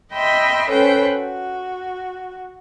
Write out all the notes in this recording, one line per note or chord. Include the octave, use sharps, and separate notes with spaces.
D#5 E5 G5 B5 C6
C#4 A4 B4 C5 G5
F#4